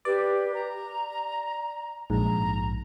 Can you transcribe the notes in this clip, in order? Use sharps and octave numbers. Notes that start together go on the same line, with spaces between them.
G4 B4 D5
A#5
A#1 G#2 A#5